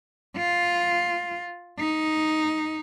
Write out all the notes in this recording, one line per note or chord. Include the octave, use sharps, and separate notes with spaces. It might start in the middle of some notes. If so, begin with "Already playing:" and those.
F4
D#4